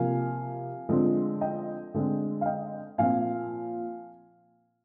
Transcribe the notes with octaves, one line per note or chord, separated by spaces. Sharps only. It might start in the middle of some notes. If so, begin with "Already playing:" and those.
Already playing: C3 F3 A#3 F5 G#5
D3 F3 G#3 C4
D#5 G5
D3 G#3 C4
F5
D#5 G5
A#2 F3 C4 F5 G#5